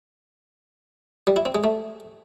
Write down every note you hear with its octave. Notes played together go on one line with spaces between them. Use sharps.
G3
E4
C4
G#3
A3